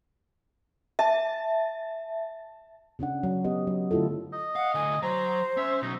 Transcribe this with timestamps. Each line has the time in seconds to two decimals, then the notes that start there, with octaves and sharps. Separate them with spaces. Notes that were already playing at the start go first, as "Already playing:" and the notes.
0.99 E5 A5
2.99 C#3 C#4 D4 F#5
3.23 F#3
3.44 B3 G4 D#5
3.67 F#3
3.91 D3 A3 E4 F4 A4
4.33 D#5
4.56 F5 F#5
4.75 A2 D3 G#5
5.02 F#3 C5 A#5
5.57 C#4 E5
5.82 B2 F#3 D#4